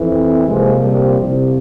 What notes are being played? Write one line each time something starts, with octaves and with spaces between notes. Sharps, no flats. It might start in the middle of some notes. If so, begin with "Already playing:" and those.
Already playing: F2 E3
C4
C2 A#2 F3 G#3
G3
C2 C3 F3